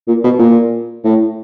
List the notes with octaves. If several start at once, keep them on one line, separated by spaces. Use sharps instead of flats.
A#2
B2
A#2
A2